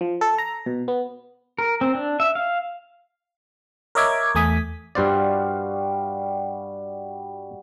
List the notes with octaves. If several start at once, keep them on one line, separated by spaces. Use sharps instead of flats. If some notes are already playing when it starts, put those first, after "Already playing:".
F3
A4
A#5
B2
B3
A#4
C4
D4
E5
F5
A#4 C#5 D#5 E5 D6 G#6
E2 A3 G#5 D#6 B6
G2 G3 F#4 C5 D5 F5